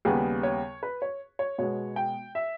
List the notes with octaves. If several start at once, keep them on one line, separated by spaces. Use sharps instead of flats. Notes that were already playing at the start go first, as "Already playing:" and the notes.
D#2 C#3 G3 B3 G#4
C#5
B4
C#5
C#5
B2 G#3 B3 C#5
G5
E5